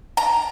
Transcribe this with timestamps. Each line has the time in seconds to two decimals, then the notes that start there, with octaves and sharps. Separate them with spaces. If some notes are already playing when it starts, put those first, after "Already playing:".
0.17 A#5